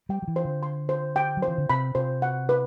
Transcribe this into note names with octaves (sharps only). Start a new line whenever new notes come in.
G3 G5
F#3
E3
C5
D3
C6
C5
G5
F#3
C5
E3
D3
C3 B5
C3 C5
F#5
B4